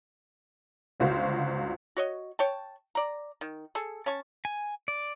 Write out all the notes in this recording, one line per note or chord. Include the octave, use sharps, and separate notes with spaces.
G1 C#2 F#4 C5 F5
F#4 C#5 D#5
C#5 G5 A5
D5 A#5
D#3
G#4 A4
C#4 A5 C#6
G#5
D5